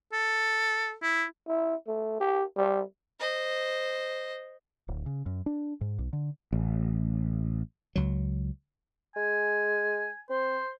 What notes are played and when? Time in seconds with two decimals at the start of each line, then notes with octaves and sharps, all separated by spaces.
0.13 A4
1.02 E4
1.48 E4
1.87 A3
2.20 G4
2.56 G3
3.19 C5 D#5
4.88 D1
5.06 C#3
5.26 F#2
5.46 D4
5.81 G#2
5.99 B1
6.13 D3
6.53 A1
7.96 C#2 F#3
9.16 G#3 G#5
10.30 C4 C5